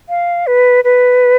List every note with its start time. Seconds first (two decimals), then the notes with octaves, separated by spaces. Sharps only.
0.09 F5
0.47 B4
0.84 B4